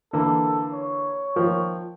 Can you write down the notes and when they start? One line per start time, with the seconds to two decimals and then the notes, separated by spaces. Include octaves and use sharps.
0.13 D3 E3 A#3 A4
0.73 C#5
1.36 D#3 F3